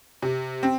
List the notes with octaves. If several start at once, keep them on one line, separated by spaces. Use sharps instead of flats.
C3
C4